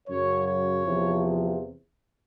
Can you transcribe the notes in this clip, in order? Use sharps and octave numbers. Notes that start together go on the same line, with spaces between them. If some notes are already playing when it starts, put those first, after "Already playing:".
F#2 C#3 F#3 C#5
C#5
E2 C3 F3